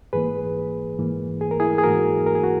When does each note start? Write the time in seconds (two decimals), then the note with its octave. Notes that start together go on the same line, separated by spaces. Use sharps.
0.13 G#2 E3 A#3 G#4 B4
0.99 G#2 E3 A#3
1.41 G#4
1.51 A#4
1.60 E4 G#4
1.78 G#4
1.84 G#2 E3 A#3 F#4 A#4
2.26 A#4
2.35 G#4
2.44 F#4